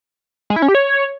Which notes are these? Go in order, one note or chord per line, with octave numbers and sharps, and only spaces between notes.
G#3
E4
C#4
G4
C#5